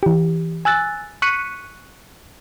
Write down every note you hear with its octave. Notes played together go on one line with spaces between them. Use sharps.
E3 G4
G#5 E6 F#6 A6
C#6 F#6 B6 C#7 D#7